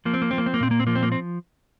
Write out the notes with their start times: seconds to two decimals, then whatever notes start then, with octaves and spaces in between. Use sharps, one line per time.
0.05 F3 A#3
0.14 C4
0.22 A#3
0.31 F3 C4
0.38 A#3
0.46 C4
0.54 A#3
0.60 A#2 C4
0.71 A#3
0.79 C4
0.87 F3 A#3
0.95 C4
1.03 A#3
1.12 C4